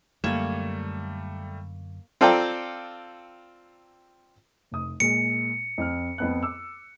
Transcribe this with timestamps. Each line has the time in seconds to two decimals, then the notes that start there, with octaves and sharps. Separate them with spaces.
0.24 F#2 D3 G3 A3 A#3 C#5 E7
2.21 C4 F4 A4 D5 G5 A#5
4.72 F1 D#6
5.00 A#2 G#3 C#7
5.78 F2 F6
6.18 F2 B3 F#6
6.43 D6 E6